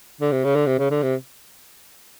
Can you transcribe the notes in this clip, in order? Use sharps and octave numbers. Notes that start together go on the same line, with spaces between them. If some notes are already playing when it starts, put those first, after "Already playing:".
D3
C3
C#3
D3
C3
C#3
D3
C3